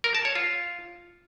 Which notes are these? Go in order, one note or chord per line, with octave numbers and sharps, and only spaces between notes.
A#4
A5
C#5
F4